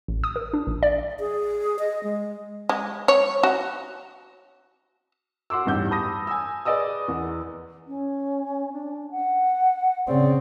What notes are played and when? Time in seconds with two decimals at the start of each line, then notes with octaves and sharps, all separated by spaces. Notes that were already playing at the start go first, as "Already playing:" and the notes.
0.08 A1
0.24 D#6
0.36 A#4
0.54 D4
0.67 A#1
0.83 D5
1.20 G#4
1.79 D#5
2.03 G#3
2.69 G#3
3.08 C#5
3.43 F#4
5.50 F#4 F#5 C6 D6 E6
5.66 A1 E2 G2 D#4 G4 G6
5.91 A5 B5 D6 D#6 A#6
6.27 G#5 E6
6.65 G#4 B4 D5 D#5 D#6 E6
7.08 E2 B3
7.88 C#4
8.73 D4
9.11 F#5
10.07 C#3 C4 D5